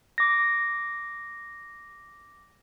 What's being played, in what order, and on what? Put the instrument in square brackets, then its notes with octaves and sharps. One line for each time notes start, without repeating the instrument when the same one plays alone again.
[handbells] D6 A#6